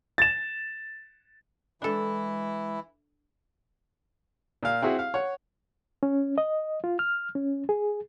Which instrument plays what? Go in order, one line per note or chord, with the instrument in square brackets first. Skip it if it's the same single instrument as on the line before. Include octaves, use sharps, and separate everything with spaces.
[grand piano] A6 E7
[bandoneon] E3 E4 [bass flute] G#3 [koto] D4 A4
[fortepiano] A#2 F5
C4 E4 F#4 G#4
F5
C#5 F#5
[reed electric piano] C#4
D#5
F4
F6
C#4
G#4